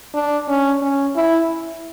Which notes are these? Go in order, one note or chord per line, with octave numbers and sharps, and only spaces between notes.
D4
C#4
C#4
E4